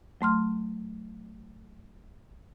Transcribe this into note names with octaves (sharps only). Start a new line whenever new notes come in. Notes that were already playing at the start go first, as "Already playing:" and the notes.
F#3 A3 C6 F6